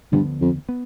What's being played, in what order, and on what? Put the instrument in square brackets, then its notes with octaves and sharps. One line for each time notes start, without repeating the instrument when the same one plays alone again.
[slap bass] D2 D3 F3 B3 [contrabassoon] G2
[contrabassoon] F2
[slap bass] B3